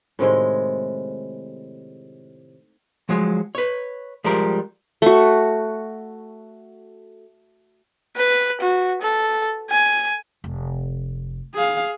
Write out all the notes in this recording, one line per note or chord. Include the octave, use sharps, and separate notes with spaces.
A2 C3 D#3 G#3
F3 F#3 G#3
B4 C#5
F3 G3 G#3 G4 A#4
A3 F#4
B4
F#4
A4
G#5
F1
G#4 F5